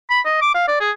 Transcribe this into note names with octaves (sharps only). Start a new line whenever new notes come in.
B5
D#5
D6
F5
D5
G#4